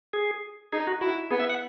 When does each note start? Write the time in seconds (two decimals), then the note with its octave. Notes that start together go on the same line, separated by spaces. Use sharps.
0.13 G#4
0.73 D#4 G#4
0.87 F#4
1.01 E4 F#4
1.31 B3 G#4
1.40 E5
1.49 F#5